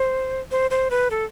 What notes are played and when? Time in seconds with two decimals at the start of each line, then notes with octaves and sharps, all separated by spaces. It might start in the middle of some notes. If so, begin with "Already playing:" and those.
Already playing: C5
0.51 C5
0.71 C5
0.91 B4
1.11 A4